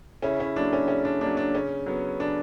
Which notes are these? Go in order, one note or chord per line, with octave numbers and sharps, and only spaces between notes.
C#3 C#4 E4
C#4 E4
F#3 A#3 D4
C#4
C#3 C#4
D4
F#3 A#3 D4
D4
C#3 C#4
F#3 B3
C#3 D4